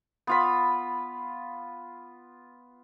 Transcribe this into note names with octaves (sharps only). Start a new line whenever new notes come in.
B3 F4 B5